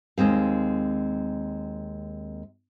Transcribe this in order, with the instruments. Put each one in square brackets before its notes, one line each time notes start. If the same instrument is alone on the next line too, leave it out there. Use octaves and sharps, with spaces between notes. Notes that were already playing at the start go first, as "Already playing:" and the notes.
[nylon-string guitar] D#2 G#3 C4 F5